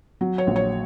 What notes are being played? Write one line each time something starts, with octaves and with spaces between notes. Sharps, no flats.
F#3
C#5
A#1
C#5